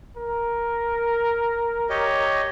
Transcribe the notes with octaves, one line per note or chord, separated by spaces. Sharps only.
A#4
G4 C#5 D#5